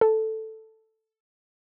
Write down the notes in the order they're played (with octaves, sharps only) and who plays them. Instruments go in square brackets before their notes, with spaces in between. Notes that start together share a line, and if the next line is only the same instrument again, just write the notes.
[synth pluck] A4